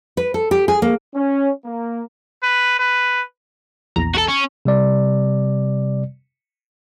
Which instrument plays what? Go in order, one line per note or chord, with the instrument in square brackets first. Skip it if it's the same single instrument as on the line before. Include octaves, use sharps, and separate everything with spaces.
[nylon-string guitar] B4
A4
G4
G#4
A#3
[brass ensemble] C#4
A#3
[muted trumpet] B4
B4
[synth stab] A#1 E2 A#5
[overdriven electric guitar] F#4 A4
C#4
[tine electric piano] C3 G3 D5